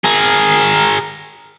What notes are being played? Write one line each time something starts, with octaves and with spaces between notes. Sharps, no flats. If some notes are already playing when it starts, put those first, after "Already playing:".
G#4 A#4